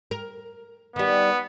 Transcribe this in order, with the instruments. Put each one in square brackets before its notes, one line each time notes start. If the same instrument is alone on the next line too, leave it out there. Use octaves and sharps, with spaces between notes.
[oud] A#4
[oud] D#3 G3 [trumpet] B3